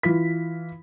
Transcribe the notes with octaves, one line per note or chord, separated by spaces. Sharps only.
E3 F4 B6